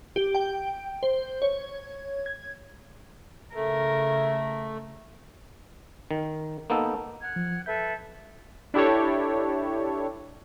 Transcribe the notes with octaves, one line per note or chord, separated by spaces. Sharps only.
G4
G5
C5
C#5
G#6
C#3 A3 A#4
D#3
A#3 B3 D#4 A4
F#5 F6 G#6
F3
A4 B4 E5 G6
D4 E4 G4 A4 C#5